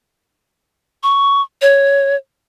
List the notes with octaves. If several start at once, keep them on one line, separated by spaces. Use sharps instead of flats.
C#6
C#5